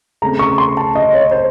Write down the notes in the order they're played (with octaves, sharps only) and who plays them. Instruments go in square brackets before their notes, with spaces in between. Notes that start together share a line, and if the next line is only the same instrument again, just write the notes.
[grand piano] C#3 A3 C4 A#5
C#6
C6
A5
D#5
C#5
C5